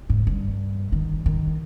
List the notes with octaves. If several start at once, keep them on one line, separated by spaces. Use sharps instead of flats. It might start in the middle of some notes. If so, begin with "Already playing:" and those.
G#2
G2
D#3
D#3